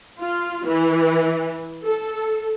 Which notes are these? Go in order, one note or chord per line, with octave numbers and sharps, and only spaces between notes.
F4
E3
A4